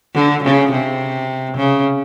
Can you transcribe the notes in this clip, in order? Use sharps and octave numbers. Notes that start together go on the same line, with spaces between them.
D3
C#3
C3
C#3